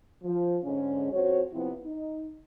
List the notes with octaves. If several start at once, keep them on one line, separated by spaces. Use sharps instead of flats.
F3
G#2 D3 G#3 C#4
F2 F#4 C5 C#5
C3 F3 B3 C4 E4
D#4